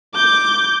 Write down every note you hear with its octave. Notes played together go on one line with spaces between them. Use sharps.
D6 G6